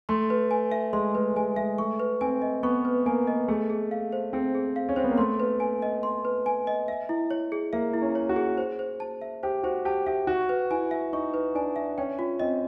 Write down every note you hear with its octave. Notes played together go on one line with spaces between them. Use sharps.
A3 C6
B4
G#5
E5
G#3 C6
A3 B4
G#3 G#5
G#3 E5
A3 C#6
B4
C4 G#5
D#5
B3 C#6
B4
A#3 G#5
D#5
A3 G#4
G#4
F5
C5
C4 G#4
G#4
F5
C#4
C4 C5
B3
A#3
A3 C6
B4
G#5
D#5
C6
B4
G#5
D#5
E5
E4
C#5
G#4
A#3 E5
E4
C#4
C#5
F#4
G#4
C5
C5
A5
E5
G4 C5
F#4 C5
G4 A5
G4 E5
F#4 C#6
B4
E4 G#5
E5
D#4 C#6
B4
D4 G#5
E5
C#4 G5
F4
C4 D#5